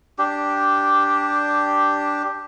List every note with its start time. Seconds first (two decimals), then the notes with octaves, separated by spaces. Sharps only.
0.18 D4 G4